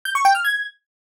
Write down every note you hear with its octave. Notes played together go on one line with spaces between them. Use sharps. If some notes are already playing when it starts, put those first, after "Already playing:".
G6
C#6
G5
F6
G#6